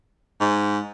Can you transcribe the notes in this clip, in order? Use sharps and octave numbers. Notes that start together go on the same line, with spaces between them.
G#2